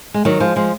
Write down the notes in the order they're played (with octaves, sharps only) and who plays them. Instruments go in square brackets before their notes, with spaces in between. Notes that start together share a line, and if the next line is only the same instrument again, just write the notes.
[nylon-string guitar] G#3
D#3 F#3
F3 G#3
F3 G#3